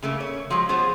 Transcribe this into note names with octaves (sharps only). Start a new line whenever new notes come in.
C#3 A3 A#3
C#5
F3 F#3 G#3
B3 F4 G#4 C5 C#5